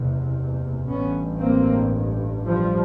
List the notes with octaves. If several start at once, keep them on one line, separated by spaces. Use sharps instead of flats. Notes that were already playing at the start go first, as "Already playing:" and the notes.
Already playing: F#1 E2 C3
A1 G2 B3 C#4
A#3 C4
F3 G3